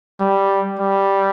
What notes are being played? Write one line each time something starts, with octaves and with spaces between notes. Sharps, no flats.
G3
G3